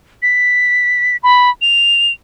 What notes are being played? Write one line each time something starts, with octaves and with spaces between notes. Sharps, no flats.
B6
B5
F7